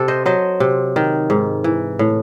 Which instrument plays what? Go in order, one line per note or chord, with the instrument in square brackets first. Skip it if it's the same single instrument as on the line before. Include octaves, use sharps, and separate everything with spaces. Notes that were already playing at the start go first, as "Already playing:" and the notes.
Already playing: [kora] C3 A4
C5 D#5
F#3 C5 D#5
C3
D#3
G#2
E3
A2